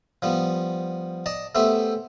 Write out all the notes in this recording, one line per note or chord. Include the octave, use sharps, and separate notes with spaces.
F3 G3 B3
D5 D#5 A5
A3 B3 G4 C5 E5